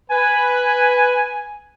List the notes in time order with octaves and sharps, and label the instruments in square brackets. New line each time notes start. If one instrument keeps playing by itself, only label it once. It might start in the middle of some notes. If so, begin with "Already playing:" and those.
[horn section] B4 [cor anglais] G#5